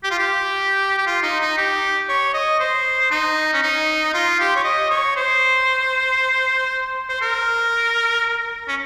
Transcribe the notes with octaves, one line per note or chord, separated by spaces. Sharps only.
G4
F4
G4
G4
F4
D#4
D#4
G4
C#5
D#5
C5
D#4
C#4
D#4
F4
G4
C#5
D#5
C#5
C5
C5
A#4
C#4